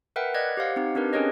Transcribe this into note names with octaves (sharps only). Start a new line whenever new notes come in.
A#4 B4 E5 F#5 G5
D5 D#5 F#6 G#6
G4 C5 F5 F#5
C4 D#4 G4
C4 D4 G4 A#4 B4
C#4 D4 G#4 A#4 C#5 D#5